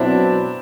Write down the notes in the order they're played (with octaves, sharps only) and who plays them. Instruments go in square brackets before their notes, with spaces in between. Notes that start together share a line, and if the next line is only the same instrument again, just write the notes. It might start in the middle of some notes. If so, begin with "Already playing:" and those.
Already playing: [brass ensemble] B2 F#3 B3 D4 [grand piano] C4 E4